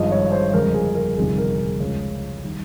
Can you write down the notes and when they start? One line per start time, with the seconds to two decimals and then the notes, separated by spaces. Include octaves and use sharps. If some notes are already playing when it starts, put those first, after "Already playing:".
Already playing: G#1 G2 F3 G#3 D#5
0.12 C#5
0.32 C5
0.54 G1 F2 C#3 G#3 A#4
0.74 G#4
0.95 A#4
1.17 G1 F2 C3 D#3 G#4
1.38 A#4
1.58 G#4
1.80 C#2 C#3 F3 G#3
2.44 D#3 G3